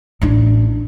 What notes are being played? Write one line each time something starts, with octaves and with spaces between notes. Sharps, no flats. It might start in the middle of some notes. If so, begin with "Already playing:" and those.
A1 D4